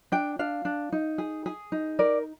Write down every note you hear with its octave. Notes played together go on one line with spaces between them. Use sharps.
D4 G5
D4 F5
D4
D#4
G#4
G#4
D#4
A#4 D5